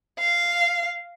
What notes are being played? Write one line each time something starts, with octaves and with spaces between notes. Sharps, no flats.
F5